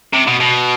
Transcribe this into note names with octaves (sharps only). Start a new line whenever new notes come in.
C3
B2
B2